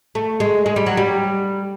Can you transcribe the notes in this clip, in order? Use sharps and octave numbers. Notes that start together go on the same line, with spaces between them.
A3
G#3
G#3
G3
F#3
G3